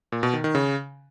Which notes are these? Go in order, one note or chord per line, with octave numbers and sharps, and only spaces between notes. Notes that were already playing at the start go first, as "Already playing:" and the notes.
A#2
B2
D#3
D#3
C#3